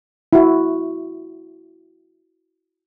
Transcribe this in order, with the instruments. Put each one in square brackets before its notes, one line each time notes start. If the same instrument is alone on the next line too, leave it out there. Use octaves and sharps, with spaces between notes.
[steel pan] E4 F#4